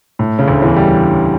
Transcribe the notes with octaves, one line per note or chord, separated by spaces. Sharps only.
A2
C#3
D2 D3
E2 E3
G3